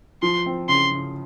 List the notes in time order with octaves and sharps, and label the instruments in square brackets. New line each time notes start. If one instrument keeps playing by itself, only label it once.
[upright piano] F3 [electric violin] C6
[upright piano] C4
[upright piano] C#3 [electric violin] C6
[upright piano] C#3